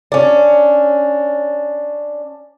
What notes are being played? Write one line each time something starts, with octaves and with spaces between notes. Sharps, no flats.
C#4 D4